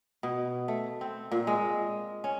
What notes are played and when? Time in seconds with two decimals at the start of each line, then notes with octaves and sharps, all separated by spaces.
0.23 B2
0.68 A3
1.01 C4
1.32 A#2
1.47 G#3
2.24 C#4